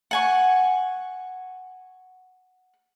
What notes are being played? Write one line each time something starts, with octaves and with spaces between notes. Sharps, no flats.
F#5 G#5 C#6